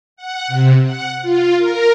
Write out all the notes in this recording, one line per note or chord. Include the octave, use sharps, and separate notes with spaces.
F#5
C3
F#5
F4
A#4